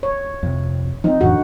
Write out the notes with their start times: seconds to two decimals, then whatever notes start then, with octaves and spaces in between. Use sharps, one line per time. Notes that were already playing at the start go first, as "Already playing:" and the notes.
0.03 C#5
0.43 F2 C3
1.04 F3 G3 C4 D#4
1.21 F2 A2 D3 E3 F#4